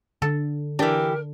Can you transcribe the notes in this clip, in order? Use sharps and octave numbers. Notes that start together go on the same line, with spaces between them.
D3 A4
E3 D4 G4 A#4